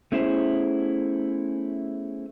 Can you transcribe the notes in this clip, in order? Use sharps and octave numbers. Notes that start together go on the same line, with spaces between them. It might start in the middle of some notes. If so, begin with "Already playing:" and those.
A3 B3 C#4 E4 G#4 C5